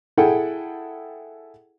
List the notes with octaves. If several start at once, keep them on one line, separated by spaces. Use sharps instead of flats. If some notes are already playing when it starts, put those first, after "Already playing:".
E4 G#4 A4 F#5 G5